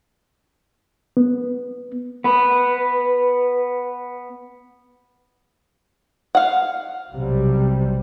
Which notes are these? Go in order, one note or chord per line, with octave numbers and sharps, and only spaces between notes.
B3
B3 B4
F5 F#5
B1 C3 G3